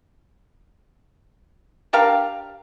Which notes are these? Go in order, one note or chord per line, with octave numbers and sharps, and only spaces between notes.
D4 G4 A#4 F5